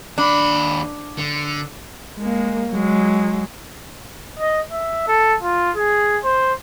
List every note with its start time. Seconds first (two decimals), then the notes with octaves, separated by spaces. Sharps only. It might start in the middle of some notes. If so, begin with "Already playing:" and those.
0.18 D#2 D4 B5
1.18 D3
2.18 G#3 A#3
2.72 F#3 G#3
4.39 D#5
4.71 E5
5.07 A4
5.42 F4
5.76 G#4
6.24 C5